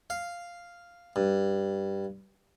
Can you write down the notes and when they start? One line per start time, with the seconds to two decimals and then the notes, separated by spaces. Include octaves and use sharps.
0.10 F5
1.16 G2